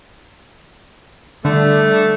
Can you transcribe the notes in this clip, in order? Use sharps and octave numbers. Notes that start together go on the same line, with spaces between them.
D3 G3 A3 D4